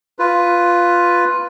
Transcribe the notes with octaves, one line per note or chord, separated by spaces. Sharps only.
F4 B4